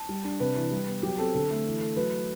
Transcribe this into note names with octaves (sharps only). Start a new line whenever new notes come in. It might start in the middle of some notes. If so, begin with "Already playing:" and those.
Already playing: A5
G3
D4
C3 B4
E3
G3
B3
F#3 G4
C4 A4
D3 A4
A3
E3
A3
F#3 B4